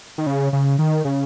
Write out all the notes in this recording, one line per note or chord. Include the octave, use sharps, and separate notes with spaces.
D#3
C#3
C#3
D#3
C#3